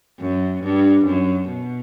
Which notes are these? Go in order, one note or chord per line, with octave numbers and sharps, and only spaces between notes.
F#2
G2
F#2
B2